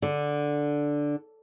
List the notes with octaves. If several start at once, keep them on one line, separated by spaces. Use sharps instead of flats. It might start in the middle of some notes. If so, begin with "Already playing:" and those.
D3